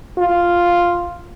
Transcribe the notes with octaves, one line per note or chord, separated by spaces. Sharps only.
F4